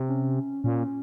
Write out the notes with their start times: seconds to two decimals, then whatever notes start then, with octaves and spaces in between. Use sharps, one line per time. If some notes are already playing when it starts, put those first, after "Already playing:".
Already playing: C3
0.09 C#4
0.64 A#2 C#4